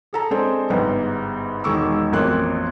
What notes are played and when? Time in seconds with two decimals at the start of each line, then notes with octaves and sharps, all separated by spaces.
0.13 G#4 A4 A#5
0.31 G#3 C4 D4 G#4 A4 C5
0.70 G1 G#2 B3 G5
1.64 E1 D#3 G#3 C#6 D6 E6
2.12 A1 F2 B2 A#3 C6 F#6